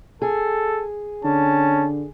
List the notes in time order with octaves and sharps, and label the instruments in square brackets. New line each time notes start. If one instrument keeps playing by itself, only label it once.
[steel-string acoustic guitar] G#4 [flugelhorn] A4
[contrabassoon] D3 [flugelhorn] C#4 [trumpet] A5